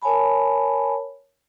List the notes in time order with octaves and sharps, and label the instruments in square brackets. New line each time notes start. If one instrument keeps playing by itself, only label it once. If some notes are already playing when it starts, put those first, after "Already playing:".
[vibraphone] A#4 C#5 G#5 A5 B5